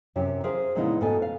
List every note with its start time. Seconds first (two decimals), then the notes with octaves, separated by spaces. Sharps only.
0.16 F#2 C3 C#4 G4
0.44 G#4 A#4 C5 E5 F5
0.75 A#2 C#3 G#3 B3 D#4 E4
1.01 G#2 B2 B3 A4 G#5
1.22 F5